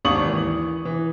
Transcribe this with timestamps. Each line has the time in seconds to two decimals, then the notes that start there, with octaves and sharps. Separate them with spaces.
0.05 G#1 D#2 D5 C#6 D#6 F#7
0.26 E3
0.85 E3